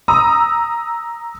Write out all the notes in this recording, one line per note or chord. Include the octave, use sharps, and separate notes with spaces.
A#5 D#6 E6